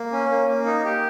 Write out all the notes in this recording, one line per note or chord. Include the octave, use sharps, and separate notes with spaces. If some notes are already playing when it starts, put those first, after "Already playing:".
Already playing: A#3
C#4
A#3
A#3
D#4
G4